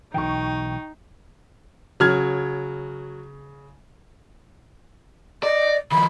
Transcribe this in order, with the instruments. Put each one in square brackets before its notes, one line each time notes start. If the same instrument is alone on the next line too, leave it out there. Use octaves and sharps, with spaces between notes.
[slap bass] B1 B2 E3 [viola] D#4 [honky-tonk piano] G5 C#6
[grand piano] C#3 F6 G#6 [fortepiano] F#3
[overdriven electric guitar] D5 [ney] D#5
[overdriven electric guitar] D#3 F3 [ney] B5